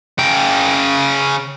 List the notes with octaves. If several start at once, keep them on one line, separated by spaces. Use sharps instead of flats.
C#3 G5